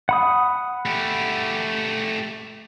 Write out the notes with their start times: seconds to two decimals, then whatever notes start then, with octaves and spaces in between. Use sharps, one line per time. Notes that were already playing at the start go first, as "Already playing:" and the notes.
0.09 F#5 B5 D#6
0.86 A3 G4